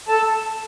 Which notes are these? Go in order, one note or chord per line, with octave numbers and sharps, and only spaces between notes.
A4 A5